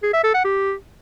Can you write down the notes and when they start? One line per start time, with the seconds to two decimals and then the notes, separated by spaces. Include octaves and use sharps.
0.03 G#4
0.13 E5
0.24 A4
0.34 F#5
0.45 G4